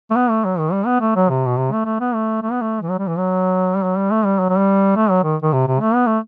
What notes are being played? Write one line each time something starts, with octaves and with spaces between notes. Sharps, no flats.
A3
B3
A3
F#3
D#3
G3
B3
A3
F#3
C3
B2
C3
A3
A3
B3
A3
A3
B3
A3
E3
F#3
G3
E3
F#3
G3
F#3
G3
A3
G3
F#3
F#3
G3
A3
F#3
D#3
D#3
C3
C3
A3
B3
A3